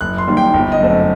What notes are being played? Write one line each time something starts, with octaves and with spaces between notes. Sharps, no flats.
F#1 F#6
C6
F#2 D#3 G3 A#3
G5
G1
D#5
F#2 D3 A3 C4